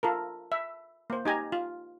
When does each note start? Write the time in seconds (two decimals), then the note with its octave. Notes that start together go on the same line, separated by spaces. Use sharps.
0.03 F4 A4 A#4
0.52 E5
1.10 A#3 C5
1.25 D#4 G4 G#5 A#5
1.52 F4